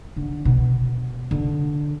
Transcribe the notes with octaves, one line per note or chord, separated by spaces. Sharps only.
D3
B2
D3